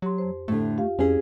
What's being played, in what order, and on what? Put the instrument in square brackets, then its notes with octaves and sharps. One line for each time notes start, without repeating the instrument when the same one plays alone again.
[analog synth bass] F#3 [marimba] G4 C6
[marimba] F2 C5
[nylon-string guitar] A2 D3 [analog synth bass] A3
[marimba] F4 G4 F5
[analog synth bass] F2 [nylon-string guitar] C#4 G#4 [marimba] E4 G4